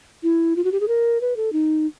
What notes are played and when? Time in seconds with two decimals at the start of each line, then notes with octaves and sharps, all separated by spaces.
0.23 E4
0.56 F4
0.64 F#4
0.72 G4
0.80 G#4
0.88 A#4
1.21 B4
1.37 A4
1.53 D#4